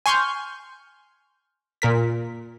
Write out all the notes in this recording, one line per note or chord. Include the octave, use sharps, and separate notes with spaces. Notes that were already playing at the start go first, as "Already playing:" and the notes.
G#5 C6 C#6 F6 G6
A#2 A#4 B6